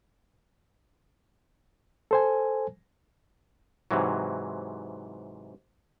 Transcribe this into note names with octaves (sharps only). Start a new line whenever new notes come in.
A4 C5 G#5
G#2 C3 E3 F#3